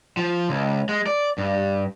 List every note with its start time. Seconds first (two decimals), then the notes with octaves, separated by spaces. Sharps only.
0.17 F3
0.49 C#2
0.89 G#3
1.07 D5
1.38 G2